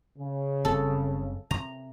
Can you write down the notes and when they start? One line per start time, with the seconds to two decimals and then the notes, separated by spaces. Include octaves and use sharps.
0.18 C#3
0.65 F#1 G3 C4 A4
1.51 C3 A#5